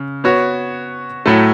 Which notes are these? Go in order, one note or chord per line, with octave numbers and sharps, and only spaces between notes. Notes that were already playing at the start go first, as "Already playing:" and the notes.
Already playing: C#3
B3 F#4 C#5
A2 F#3 A3